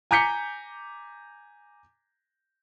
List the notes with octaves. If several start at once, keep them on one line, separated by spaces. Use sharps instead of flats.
G#5 A#5 D6 G6 B6 C#7